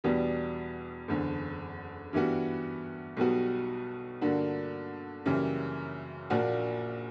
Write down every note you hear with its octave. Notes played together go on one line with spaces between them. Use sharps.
E2 B2 G3 B3 D4
F#1 E2 D3
G2 E3 G3 B3 F#4
B1 B2 G3 B3 F#4
G2 D3 A#3 D4 F#4
F#2 C#3 E3 G3 A#3
A#1 A#2 A#3 D4 F#4